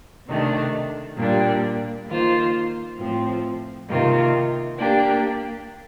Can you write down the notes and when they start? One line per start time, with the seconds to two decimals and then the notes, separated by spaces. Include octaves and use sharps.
0.28 C3 D#3 A3 D4
1.18 A#2 G3 D4 G4
2.08 D#3 A#3 F4 C5
2.98 A2 F3 C4
3.89 C3 D#3 A#3 F4
4.78 A#3 D4 G4